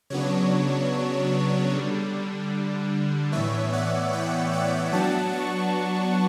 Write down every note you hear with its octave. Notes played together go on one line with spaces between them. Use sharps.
C#3 F#3 B3 D4 C#5
D3 G3 D4
A2 E3 B3 C#5 E5
D5 F#5
E5 G5
D5 F#5
F#3 B3 D4 F#5 A5
A5 C#6